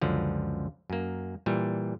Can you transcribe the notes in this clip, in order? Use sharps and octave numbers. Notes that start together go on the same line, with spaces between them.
C#2 F#2 D3 F3
F#2 A#3
A#2 E3 G3